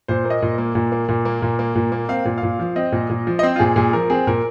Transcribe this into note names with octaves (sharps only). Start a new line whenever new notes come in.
A#2 C5
A#3
D#5
A#2
A#3
A#2
A#3
A#2
A#3
A#2
A#3
A#2
A#3
C4 F5
A#2
F5
A#2
F3
C4 D#5
A#2
A#2
F3
D#5
C4 C5
F4
A#2 G#4
A#2 G#4
F3 A#4
C4 G#4
A#2 A#4